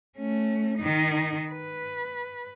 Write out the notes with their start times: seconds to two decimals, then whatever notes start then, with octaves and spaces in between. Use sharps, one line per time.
0.18 A3 C#4
0.78 D#3 D#4
1.51 B4